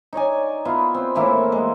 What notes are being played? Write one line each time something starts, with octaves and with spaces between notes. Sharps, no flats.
D#4 C#5 D5 G#5
B3 E4 F4
C4
A2 E3 A#3 E4
G#3